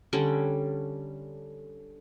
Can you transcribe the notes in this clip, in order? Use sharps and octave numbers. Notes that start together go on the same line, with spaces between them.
D3 G3 C#4